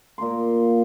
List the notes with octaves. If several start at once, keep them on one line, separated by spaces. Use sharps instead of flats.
A#2 A#3 A#5 C6